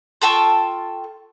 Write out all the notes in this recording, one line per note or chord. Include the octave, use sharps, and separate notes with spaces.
F4 A4 G5 C#6